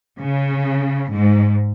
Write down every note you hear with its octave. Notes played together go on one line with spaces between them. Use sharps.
C#3
G#2